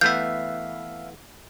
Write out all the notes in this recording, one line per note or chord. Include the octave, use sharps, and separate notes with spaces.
E3 A3 B3 E5 F5 G6